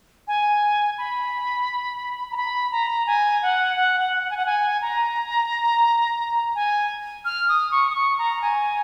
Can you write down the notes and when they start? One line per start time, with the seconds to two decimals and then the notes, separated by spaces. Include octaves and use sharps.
0.28 G#5
0.98 B5
2.31 A#5
2.37 B5
2.72 A#5
3.07 G#5
3.42 F#5
3.76 F#5
4.00 F#5
4.23 F#5
4.30 G#5
4.37 F#5
4.46 G#5
4.81 A#5
6.55 G#5
7.25 F6
7.49 D#6
7.71 C#6
7.90 D#6
7.95 C#6
8.18 A#5
8.42 G#5